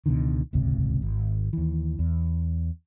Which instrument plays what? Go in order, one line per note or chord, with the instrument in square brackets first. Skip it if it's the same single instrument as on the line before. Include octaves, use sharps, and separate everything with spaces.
[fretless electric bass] C#2 B2 D3 D#3
D#1 G#1 C#2 C3
G#1
D#2 E3
E2